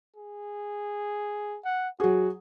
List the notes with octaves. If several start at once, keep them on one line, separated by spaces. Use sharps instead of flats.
G#4
F#5
F#3 F#4 G#4